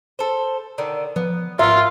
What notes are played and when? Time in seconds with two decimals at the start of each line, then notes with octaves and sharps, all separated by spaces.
0.19 A4 C5
0.78 D3 D#3
1.16 F3 B3
1.59 G#1 A#3 F4 E5 F#5